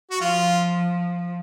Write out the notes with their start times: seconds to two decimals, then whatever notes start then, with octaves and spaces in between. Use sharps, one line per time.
0.11 F#4
0.20 F3 F4